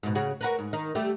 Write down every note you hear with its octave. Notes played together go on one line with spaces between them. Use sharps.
G#2 B2
C#3 F#4 G#4
F#4 A#4 B4
G#2
D#3 D#4
G3 A3 G4